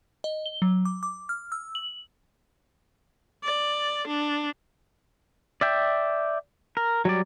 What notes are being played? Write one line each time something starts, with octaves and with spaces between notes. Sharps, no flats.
D#5
G7
F#3
D6
D6
F6
E6
F#7
D5
D4
D5 E5 G5
A#4
F#3 G3 D5